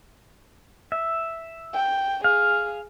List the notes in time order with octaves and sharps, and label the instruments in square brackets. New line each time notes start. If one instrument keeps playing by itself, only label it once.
[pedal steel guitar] E5
[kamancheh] G5
[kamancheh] G#4 [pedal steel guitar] F5